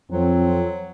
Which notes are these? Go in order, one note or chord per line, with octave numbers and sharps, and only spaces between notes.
F2 F#3 C4